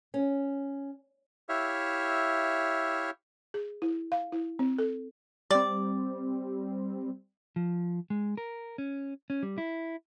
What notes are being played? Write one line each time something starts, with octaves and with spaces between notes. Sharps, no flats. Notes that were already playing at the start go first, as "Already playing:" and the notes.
C#4
E4 G4 C#5 E5 F5
G#4
E4
F5
E4
C4
A4
G3 C4 D5
F3
G#3
A#4
C#4
C#4
G3
E4